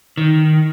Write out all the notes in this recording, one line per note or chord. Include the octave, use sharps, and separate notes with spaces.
D#3